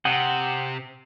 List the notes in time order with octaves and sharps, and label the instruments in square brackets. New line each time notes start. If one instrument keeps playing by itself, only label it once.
[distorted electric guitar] C3 [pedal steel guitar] F#5 G5 D#6